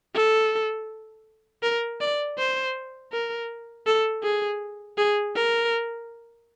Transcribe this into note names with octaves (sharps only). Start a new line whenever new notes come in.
A4
A#4
D5
C5
A#4
A4
G#4
G#4
A#4